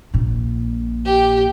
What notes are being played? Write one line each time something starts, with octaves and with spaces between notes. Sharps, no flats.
A#1 A#2
G4